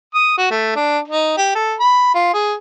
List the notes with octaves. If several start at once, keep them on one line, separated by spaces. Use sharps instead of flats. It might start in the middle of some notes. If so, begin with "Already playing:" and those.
D#6
F#4
A3
D4
D#4
G4
A4
B5
F4
G#4